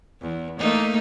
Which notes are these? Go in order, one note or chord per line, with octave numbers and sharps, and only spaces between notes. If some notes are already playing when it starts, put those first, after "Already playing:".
E2
A3 A#3 D#4